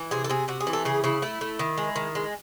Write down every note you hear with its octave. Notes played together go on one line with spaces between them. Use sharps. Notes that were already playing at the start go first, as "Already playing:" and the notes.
Already playing: E3
C3 G#4
A4
C3 G#4
C3 F#4
G#4
E3
A4
C#3 G#4
C#3 E4
A3 E4
A3
D#3
G#3
D#3
G#3